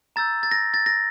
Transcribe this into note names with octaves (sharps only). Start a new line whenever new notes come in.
A#5 E6 G6 A6
A6
A#6
A6
A#6